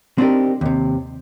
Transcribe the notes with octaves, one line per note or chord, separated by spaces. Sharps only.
C4 D4 D#4 F4 G4 A#4
D#2 C3